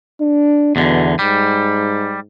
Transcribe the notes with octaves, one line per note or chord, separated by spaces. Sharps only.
D4
E2 B2 D3
G#2 G3